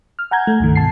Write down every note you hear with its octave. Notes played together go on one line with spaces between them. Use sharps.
F6
F#5 G#5 A#5 G6 G#6
A3
C#2 G2 D#3
B2 A5 C7